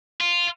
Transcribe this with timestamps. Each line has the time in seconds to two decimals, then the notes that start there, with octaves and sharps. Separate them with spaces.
0.21 F4